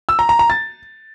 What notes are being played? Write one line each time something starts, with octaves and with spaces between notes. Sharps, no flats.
E6
A#5
A#5
A#5
A6